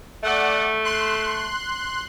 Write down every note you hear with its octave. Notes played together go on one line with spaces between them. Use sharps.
A3 D5 F#5
C6 F#6